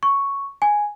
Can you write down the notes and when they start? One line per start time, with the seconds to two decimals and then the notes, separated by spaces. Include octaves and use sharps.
0.03 C#6
0.62 G#5